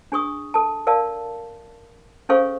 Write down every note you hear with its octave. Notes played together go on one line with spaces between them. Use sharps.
D4 G#4 C#6 D#6
A4 A5
A#4 D5 F5 A5
C#4 G#4 A4 C5 F5 C#6